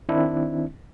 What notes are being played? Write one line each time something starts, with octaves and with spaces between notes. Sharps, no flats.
D#3 C4 D4 E4